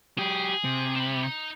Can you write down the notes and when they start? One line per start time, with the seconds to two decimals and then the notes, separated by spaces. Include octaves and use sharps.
0.18 F#3 G4 G#4
0.64 C3
0.96 C4 B5
1.22 D#4